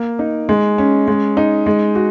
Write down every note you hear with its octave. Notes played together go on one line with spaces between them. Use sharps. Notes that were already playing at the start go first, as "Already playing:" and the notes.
Already playing: A#3
D#4
G#3
C#4
G#3
D#4
G#3
F#4